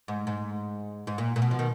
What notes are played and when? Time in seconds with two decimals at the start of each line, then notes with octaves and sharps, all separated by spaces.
0.08 G#2
0.27 G#2
1.07 G#2
1.18 A#2
1.36 A#2
1.42 B2
1.51 F3
1.59 D#3